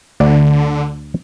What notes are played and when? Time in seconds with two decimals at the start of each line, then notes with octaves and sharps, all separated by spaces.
0.20 D2 D3 D5 F#5